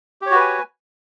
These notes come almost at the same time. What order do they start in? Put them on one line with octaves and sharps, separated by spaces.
G4 C#5 F#4 B4 G#5